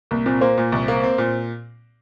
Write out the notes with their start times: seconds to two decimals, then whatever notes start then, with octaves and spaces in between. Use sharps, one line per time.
0.11 C2 A#3
0.26 A#2 C4
0.41 A#3 C5
0.58 A#2
0.72 C2
0.88 A#3
1.04 C4
1.18 A#2